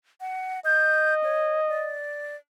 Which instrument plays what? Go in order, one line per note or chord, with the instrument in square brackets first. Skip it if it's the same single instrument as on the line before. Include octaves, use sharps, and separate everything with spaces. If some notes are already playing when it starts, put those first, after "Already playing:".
[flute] F#5
[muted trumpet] D#5 [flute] G6
[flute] C#5
D5